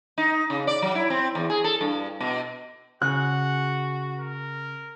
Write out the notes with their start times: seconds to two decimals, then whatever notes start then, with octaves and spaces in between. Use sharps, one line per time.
0.18 D#4
0.50 C#3
0.67 D5
0.82 F#3
0.95 E4
1.10 C4
1.35 E2
1.50 G#4
1.64 A4
1.81 G2
2.20 B2
3.02 C#3 F#4 G#4 F#5 F#6
4.17 A#4